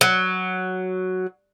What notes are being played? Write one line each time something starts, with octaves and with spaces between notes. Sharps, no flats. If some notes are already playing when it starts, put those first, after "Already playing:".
F#3